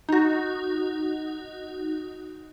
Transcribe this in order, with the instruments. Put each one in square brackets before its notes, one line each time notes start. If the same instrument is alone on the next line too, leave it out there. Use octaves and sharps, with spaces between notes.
[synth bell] D#4 F#4